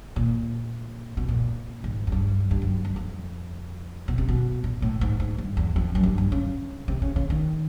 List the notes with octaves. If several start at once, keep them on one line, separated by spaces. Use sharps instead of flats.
A#2
B2
A#2
G#2
F#2
G2
F#2
G2
F#2
F#2
F2
B2
C3
B2
A#2
A2
G#2
G#2
G2
E2
F2
F#2
G2
G2
C#3
C3
C#3
C#3
D#3